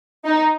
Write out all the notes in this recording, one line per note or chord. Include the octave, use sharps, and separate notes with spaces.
D#4